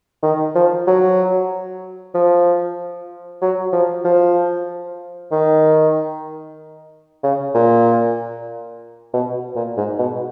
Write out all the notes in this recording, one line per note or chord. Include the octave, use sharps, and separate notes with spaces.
D#3
F3
F#3
F3
F#3
F3
F3
D#3
C#3
A#2
B2
A#2
G#2
B2